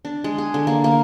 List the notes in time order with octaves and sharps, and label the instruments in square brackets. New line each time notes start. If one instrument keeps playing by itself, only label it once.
[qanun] D4
G#3
G#4
D3
A#3
A#3